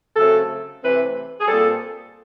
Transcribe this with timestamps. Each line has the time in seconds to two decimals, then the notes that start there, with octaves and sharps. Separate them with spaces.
0.16 C#3 F#3 A3 C4 A4
0.82 C3 E3 A3 C4 B4
1.39 G#4
1.46 A#2 G3 C4 A4